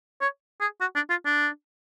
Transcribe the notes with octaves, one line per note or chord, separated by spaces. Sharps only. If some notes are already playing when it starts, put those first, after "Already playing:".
C#5
G#4
F#4
D4
F4
D4